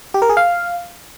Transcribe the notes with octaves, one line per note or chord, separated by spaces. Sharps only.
G4
A#4
G#4
F5